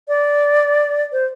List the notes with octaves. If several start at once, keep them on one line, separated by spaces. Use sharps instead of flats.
D5
C5